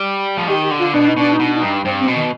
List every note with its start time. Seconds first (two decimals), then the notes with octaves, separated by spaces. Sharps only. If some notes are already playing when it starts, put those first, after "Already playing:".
Already playing: G3
0.38 F3
0.48 D#3 G4
0.64 G4
0.71 D3
0.79 F4
0.94 B2 D4
1.06 D#4
1.17 B2 D4
1.32 D#4
1.39 B2
1.45 D4
1.56 D#4
1.62 G2
1.70 D4
1.85 G2 C4
2.01 C4
2.07 B2
2.16 D#3